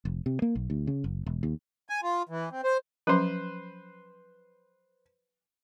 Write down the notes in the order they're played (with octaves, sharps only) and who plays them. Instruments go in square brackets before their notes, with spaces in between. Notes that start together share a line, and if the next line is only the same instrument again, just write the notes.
[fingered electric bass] F1
C3
A#3
B1
D2
C#3
F#1
E1
D#2
[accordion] G#5
F4
E3
C4
C5
[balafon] F3 F#3 C#4 [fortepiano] B4 C5